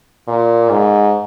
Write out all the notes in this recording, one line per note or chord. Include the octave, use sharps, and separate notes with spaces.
A#2
G#2